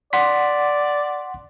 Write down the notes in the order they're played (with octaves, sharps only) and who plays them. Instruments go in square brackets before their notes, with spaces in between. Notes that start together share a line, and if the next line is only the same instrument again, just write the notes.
[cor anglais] D5 [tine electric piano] F#5 C6 B6